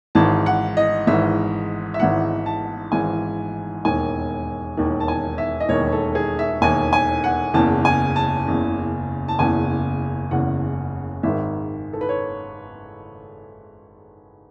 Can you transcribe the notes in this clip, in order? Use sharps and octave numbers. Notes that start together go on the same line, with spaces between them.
G#1 G#2 E3 A5
F#5
D#5
G#1 G#2 E3 E5
E5
G#1 G#2 E3 F#5
A5
G#1 G#2 E3 G#5
E1 D#2 D#3 G#5
E1 D#2 D#3
A5
G#5
E5
D#5
E1 D#2 D#3 C#5
A4
G#4
E5
E1 D#2 D#3 G#5
G#5
F#5
F#1 E2 C#3 A5
G#5
A5
F#1 E2 C#3
A5
F#1 E2 C#3 G#5
F#1 E2 C#3 F#5
G#1 G#2 D#3 E5
A4
B4
C#5